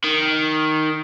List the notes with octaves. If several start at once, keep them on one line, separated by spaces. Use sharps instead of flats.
D#3